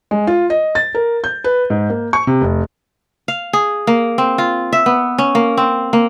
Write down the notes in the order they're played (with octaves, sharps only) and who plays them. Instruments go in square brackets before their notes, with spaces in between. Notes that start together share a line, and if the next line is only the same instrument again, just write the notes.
[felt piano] G#3
F4
D#5
A6
A#4
G6
B4
G#2
A#3
C#6
C3
F1
[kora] F5
G#4
A#3
C4
F4
E5
B3
C#4
A#3
C4
A#3